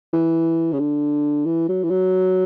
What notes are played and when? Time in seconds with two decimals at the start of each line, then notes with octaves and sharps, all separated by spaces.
0.13 E3
0.73 C#3
0.79 D3
1.46 E3
1.68 F#3
1.83 E3
1.90 F#3